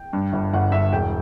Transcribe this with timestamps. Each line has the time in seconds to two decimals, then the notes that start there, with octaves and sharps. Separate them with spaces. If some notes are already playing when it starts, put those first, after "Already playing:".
Already playing: G5
0.13 G2
0.33 G1
0.54 G1 F#5
0.72 G1 E5
0.93 E1 G5